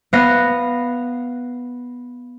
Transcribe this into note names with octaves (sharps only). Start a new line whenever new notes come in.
B3 F5 A#6